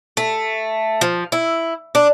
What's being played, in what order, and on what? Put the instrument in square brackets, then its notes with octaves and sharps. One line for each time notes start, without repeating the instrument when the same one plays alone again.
[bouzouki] A3
F3
E4
D4